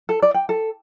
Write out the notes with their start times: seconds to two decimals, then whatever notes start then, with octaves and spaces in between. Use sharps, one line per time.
0.09 A4
0.22 D5
0.34 G5
0.49 A4